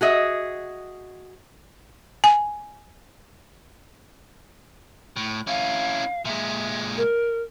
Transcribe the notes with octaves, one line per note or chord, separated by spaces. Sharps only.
F#4 G#4 D#5 E5
G#5
A2
C#4 E4 F5
A#2 G#3 E5
A#4